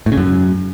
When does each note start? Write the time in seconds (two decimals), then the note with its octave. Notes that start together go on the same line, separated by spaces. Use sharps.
0.06 A2
0.12 C#3
0.17 F#2